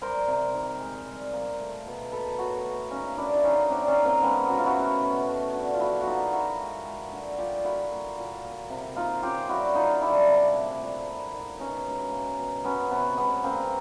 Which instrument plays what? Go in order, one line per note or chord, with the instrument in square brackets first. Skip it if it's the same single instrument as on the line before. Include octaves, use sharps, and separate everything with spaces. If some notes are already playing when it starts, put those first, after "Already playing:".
[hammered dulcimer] G3 A#4 C5
C3
D#3
G#3
G3
A#3
A3
B2
A#3 A4 B4
A2 E4 F#4
A#3
C#3 C#4 D#4
A#3 D4 E4
E4
D3 C#4 D#4
A#3 C4 D4
C#4 D#4
D#3
A#3 C4
G#3 B3 C#4
C#3 F#4
F4
E4 F#4
A3
B2
A3
D3
F4
G3 E4 F#4
F#4
A#3 D#4 F4
D#3 E4 F#4
G#3
G#3
D3
G3 F4 G4
A#3 E4 F#4
A#3
A#2
A#3
C3
A#3 D#4 F4
C#3 F4 G4
G3 E4 F#4
A#3 D#4 F4
G3 D4 E4
C3
A3
A#2
A#3
D#3
B2 C#4 D#4
G#3
A#3
B2
F#3 B3 C#4
C3 B3
G#3 B3
C#3 A#3 C4